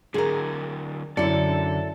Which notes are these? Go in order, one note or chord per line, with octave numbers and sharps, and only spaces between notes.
D3 F#3 G#4 A#4
F#2 D3 E4 A4 D5 C#7